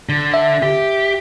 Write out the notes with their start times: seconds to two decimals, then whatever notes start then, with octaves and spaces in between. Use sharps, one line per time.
0.09 D3
0.34 E5
0.63 G4